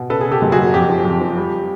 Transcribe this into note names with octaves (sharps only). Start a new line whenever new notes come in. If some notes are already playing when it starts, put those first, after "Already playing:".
Already playing: B2
C#3 A4 B4
C#3 G#4
G4 A4
F#1
F#4 G#4
F#1
F2 G4
F3
F2
F3
G3